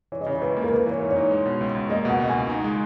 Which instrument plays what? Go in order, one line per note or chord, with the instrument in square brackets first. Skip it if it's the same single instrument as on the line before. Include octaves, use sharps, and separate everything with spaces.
[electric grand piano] E3 [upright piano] C#5
[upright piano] D#5
[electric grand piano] C#3 [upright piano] C#5
[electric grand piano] C#2 [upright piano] B4
[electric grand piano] A#3
[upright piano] A#4
[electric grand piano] A#3 [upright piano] B4
[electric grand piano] E3 [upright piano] C#5
[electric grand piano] G#2
[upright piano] C#5
[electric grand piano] D#4
G#3
B2
C#2
C#2
[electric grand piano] A#3 [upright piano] D#5
[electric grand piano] B2 [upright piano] F#5
[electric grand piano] C#2
[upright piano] G#5
[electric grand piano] C#2
D#4
G#3